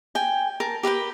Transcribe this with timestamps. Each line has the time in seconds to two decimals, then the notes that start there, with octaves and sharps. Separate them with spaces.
0.15 G5 G#5
0.60 A#4 A5
0.83 G4 A#4 B4 G5